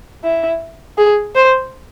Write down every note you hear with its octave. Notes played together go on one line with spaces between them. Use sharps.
E4
G#4
C5